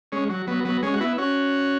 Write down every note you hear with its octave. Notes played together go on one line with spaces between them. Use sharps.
G#3 C#4
F#3
F#3 B3
F#3 B3
G#3 C#4
F#4
B3 E4
C#4 F#4